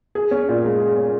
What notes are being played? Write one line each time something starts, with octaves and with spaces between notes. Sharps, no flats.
G#4
C#4
A#2
G#3
G#4
C#4